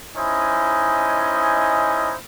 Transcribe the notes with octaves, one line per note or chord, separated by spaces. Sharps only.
C#4 D#4 E4 C5 D#5 G#5